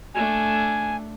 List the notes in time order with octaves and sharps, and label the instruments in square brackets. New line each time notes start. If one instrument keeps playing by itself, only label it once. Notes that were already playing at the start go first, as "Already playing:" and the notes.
[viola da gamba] A3 D4 [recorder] G#5